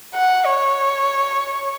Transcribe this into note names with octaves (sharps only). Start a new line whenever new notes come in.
F#5
C#5